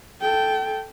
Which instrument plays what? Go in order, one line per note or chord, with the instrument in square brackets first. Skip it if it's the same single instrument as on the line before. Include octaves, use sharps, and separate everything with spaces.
[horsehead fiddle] A4 G5